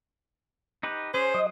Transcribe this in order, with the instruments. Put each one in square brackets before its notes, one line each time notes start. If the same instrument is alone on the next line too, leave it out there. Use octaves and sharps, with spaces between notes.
[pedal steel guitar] D#4 G4 B4
[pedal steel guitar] C#4 G#4 [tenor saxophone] C5
[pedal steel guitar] F#3 D#6 [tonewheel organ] D#5